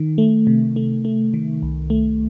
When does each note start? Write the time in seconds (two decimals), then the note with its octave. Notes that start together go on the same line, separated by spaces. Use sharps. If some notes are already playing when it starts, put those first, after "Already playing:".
Already playing: D#3
0.18 A3
0.47 C3
0.76 A3
1.05 A3
1.34 D#3
1.62 C2
1.90 A3